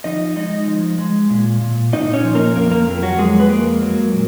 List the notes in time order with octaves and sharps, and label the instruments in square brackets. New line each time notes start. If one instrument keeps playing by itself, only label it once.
[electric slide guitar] F3 D#4 D#5
G#3 D#4 D#5
F3
G#3
A#2
A#2
A#2 D#4 D#5
C#4 C#5
F3
A#3 A#4
F2 A#3 A#4
A#3 A#4
F2
F#3 F#4
F2 G#3 G#4
B4
G#3 A#3 A#4
F#3
A#2